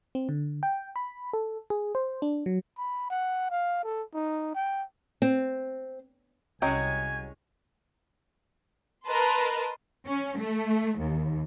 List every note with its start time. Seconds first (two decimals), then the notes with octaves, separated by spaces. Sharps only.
0.15 C4
0.29 D3
0.63 G5
0.96 B5
1.33 A4
1.70 G#4
1.95 C5
2.22 D4
2.46 F#3
2.78 B5
3.10 F#5
3.50 F5
3.84 A4
4.14 D#4
4.55 G5
5.22 C4
6.62 C2 F#3 G#3 C#4 D#5 G5 G#5
9.05 A#4 B4 D#5 A5 C6
10.08 C#4
10.40 A3
10.99 D#2